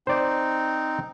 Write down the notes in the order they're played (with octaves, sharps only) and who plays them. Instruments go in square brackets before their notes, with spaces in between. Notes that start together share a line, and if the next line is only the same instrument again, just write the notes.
[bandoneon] C4 D#4 [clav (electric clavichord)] C5 D5